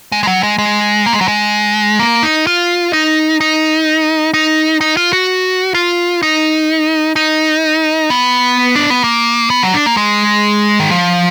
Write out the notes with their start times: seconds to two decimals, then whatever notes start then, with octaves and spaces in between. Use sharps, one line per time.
0.12 G#3
0.23 G#3
0.27 F#3
0.43 G#3
0.58 G#3
1.06 A#3
1.13 G#3
1.21 F#3
1.28 G#3
1.99 A#3
2.23 D#4
2.47 F4
2.93 D#4
3.41 D#4
4.34 D#4
4.81 D#4
4.97 F4
5.13 F#4
5.74 F4
6.23 D#4
7.16 D#4
8.10 B3
8.76 D4
8.90 B3
9.04 A#3
9.50 B3
9.63 F#3
9.74 D4
9.86 A#3
9.97 G#3
10.80 D#3
10.91 F3